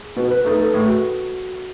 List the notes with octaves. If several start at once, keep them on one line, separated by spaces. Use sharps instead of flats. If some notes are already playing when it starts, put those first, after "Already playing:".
Already playing: G#4
B2 B4
B4
A3 D#4 A4
A4
A2 G#4
F#4